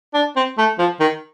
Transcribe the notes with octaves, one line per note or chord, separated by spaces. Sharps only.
D4
C4
A3
F3
D#3